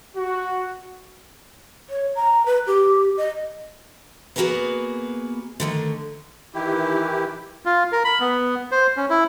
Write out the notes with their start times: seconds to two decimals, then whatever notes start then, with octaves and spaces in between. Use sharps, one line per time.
0.16 F#4
1.90 C#5
2.16 A#5
2.46 B4
2.67 G4
3.17 D#5
4.36 A#3 B3 F#4 G#4 A#4 B4
5.60 D3 D#3 A3
6.54 D#3 E3 E4 G4
7.65 F4
7.92 A#4
8.04 B5
8.20 B3
8.71 C5
8.97 C#4
9.10 E4